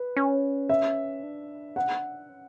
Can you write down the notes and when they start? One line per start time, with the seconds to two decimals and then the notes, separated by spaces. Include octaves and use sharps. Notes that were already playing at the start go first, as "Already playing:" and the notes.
Already playing: B4
0.17 C#4
0.69 E5
1.23 D4
1.76 F#5
2.29 C#4